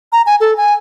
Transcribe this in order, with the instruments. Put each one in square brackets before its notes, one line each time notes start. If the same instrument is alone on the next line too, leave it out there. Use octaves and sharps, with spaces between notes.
[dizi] A#5
G#5
A4
G#5